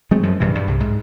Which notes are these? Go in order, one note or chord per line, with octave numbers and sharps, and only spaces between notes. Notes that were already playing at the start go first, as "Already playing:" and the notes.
F#3 G#3 A3 C4
F#2 F3
A#1 G2 C3 E3
G2 G3
C2
G#2